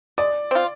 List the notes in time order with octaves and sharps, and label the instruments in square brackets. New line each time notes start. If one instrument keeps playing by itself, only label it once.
[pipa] G#3 [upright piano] D5
[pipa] C4 F4